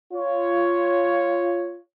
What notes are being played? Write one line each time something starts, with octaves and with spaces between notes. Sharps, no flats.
F4 C#5